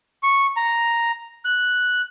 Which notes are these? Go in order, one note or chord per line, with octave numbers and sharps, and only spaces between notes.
C#6
A#5
F#6